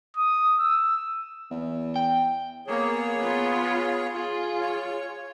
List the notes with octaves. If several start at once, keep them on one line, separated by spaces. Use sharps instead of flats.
D#6
E6
E2
G5
A#3 B3 G#4 C#5
B3 F4
F4 G#4
C#5